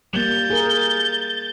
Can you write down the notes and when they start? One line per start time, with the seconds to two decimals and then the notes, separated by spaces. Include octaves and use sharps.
0.13 G3 A#3 G6 A6
0.50 G#4 A#4